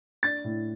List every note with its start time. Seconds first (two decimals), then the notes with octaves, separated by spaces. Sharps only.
0.23 D4 A6
0.44 A2